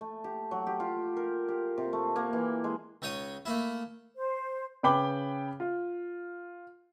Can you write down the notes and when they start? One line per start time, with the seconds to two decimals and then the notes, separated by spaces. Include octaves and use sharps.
0.01 A3
0.24 G4
0.51 F#3
0.67 G4
0.80 F4
1.17 A#4
1.48 G4
1.78 C3
1.93 A3
2.16 A#3
2.33 E3
2.64 G#3
3.02 C#2 D#4 C#5 D#6
3.45 A3 A#3 E4
4.17 C5
4.83 C#3 B4 G5 B5 D6 G7
5.60 F4